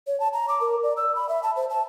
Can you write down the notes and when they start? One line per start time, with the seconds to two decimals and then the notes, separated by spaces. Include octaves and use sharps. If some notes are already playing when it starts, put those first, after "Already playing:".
0.07 C#5
0.20 A5
0.33 A#5
0.49 D6
0.61 A#4
0.83 D5
0.97 E6
1.16 B5
1.29 E5
1.43 A5
1.56 C5
1.70 A5